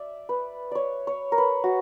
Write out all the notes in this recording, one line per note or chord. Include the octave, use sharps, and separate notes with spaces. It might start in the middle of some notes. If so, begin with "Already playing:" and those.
Already playing: D5 E5
B4
C#5 D5
C#5
A#4
B4
F#4